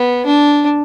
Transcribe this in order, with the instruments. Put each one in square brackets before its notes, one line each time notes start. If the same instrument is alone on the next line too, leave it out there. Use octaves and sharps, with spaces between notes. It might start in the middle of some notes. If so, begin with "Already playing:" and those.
Already playing: [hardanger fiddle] B3
D4